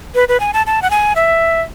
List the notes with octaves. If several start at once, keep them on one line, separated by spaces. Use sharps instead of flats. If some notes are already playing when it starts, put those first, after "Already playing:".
B4
B4
G#5
A5
A5
F#5
G#5
E5